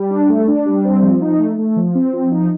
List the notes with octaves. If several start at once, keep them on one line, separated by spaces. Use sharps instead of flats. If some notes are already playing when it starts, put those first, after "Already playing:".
Already playing: G3
D4
A3
D4
G3
C4
F3
D#4
A3
A3
F3
C4
F3
D#4